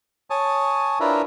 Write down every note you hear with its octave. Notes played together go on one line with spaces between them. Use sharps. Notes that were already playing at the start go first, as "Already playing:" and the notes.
C#5 G#5 A5 D#6
D4 E4 F4 A#4 B4 E5